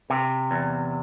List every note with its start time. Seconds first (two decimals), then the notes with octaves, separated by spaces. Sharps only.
0.10 C3
0.51 E2